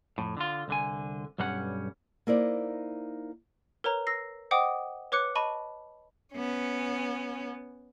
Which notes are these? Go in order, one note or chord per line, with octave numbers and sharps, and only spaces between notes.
F2 A2
D3 F4
C2 D3 G#5
B1 G2 G3 C#4 F#5
A#3 D#4 E4 A#4 C5 D5
A#4 B4 C#5 A#5
E6 A#6 C7
C5 D#5 F#5 G5 D6 D#6
B4 C#5 D6 F#6 C#7
D#5 A5 B5 C#6 D#7
B3 C#4